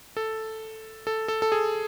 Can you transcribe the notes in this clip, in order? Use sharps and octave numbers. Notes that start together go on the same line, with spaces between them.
A4
A4
A4
A4
G#4